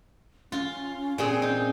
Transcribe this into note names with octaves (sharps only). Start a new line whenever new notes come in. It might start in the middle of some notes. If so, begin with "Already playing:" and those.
C#4 F4
A#2 C4 G#4
D#4